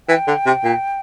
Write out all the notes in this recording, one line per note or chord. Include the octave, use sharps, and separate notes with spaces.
E3 G5
D3
C3
A#2